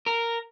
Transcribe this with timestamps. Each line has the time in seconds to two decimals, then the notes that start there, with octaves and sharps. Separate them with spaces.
0.06 A#4